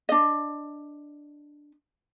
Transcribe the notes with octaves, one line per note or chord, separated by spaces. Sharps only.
D4 D#5